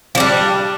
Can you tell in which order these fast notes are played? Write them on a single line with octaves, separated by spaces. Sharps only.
F3 D4 G3